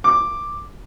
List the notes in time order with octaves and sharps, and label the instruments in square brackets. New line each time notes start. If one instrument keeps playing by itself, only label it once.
[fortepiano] D6